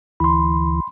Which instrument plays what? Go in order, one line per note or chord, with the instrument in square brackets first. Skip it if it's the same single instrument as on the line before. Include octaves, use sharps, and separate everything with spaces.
[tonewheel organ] D2 E3 [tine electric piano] B5 C6